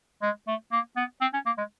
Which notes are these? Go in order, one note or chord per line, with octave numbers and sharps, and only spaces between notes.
G#3
A3
A#3
B3
C4
C#4
A#3
G#3